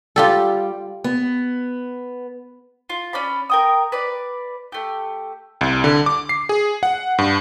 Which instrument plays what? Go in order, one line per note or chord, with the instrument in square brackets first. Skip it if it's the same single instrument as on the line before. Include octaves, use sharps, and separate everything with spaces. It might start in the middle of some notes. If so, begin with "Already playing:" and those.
[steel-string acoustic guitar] G3 [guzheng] F4 G4 A4
[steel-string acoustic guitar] B3
[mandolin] F4
C#4 D5 B5
A#4 G5 D#6
B4 D5
A3 G4
[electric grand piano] C2
D3
D6
C7
G#4
F#5
G2